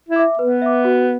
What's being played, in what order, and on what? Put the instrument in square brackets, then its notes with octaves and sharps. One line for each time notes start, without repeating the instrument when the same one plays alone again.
[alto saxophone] E4
[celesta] E5 D6
[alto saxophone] B3 [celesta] B4
[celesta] E5 D6
F#4